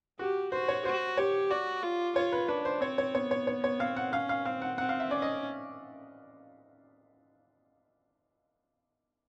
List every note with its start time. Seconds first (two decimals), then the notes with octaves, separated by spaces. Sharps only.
0.19 F#4 G4
0.52 F#4 C5
0.68 C#5
0.85 F#4 C5
1.17 G4 C#5
1.51 F#4 D5
1.83 F4
2.16 F4 C#5
2.32 B4
2.48 D4 B4
2.65 C5
2.81 C4 C#5
2.98 C#5
3.14 B3 C#5
3.31 C#5
3.47 C#5
3.64 C#5
3.80 C4 F5
3.97 F#5
4.12 C#4 F5
4.29 F5
4.45 C4 F5
4.62 F#5
4.78 C4 F#5
4.89 F5
5.00 E5
5.11 C#4 D5
5.22 D#5